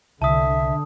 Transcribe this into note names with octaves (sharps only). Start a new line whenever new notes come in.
C2 D3 E5 A5 D#6